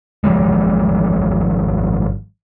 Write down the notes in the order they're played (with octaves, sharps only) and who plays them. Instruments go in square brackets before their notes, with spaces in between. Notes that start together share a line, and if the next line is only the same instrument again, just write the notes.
[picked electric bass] G#1 F3 G3 G#3